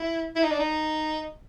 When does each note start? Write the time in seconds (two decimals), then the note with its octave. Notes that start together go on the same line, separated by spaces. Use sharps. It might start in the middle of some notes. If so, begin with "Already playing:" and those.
Already playing: E4
0.36 E4
0.43 D#4
0.51 D4
0.60 D#4